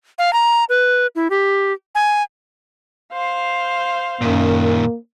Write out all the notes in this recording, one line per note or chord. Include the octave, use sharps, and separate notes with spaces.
F5
A#5
B4
E4
G4
G#5
C5 F5
F#2 A#2 D#3 A#3